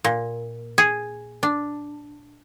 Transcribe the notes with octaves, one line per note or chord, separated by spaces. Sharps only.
A#2
G#4
D4